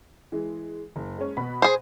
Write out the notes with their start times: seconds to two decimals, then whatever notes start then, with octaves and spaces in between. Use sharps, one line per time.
0.32 E3 G#3
0.96 F#1
1.18 G#3 C#4
1.37 B2 B3 B5
1.62 G#4 C5